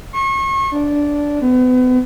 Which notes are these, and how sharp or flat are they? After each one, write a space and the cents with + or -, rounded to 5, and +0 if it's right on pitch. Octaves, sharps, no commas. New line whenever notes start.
C#6 -35
D4 -10
B3 +35